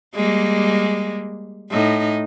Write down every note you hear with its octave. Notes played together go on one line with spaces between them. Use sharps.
G3 G#3 A#3
A2 D#4